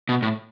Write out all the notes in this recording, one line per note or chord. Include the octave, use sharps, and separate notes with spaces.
B2
A2